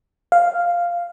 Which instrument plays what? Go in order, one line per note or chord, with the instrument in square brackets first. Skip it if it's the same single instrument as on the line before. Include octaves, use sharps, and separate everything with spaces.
[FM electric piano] F5